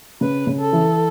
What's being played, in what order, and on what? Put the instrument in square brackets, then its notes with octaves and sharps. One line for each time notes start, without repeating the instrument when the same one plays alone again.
[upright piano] C#3 [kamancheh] B4
[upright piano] C#3
[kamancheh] A4
[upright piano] E3